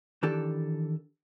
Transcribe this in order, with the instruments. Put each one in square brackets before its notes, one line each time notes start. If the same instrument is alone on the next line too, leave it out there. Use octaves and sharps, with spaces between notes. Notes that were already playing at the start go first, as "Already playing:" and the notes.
[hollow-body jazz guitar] D#3 E3 D4 G4 A4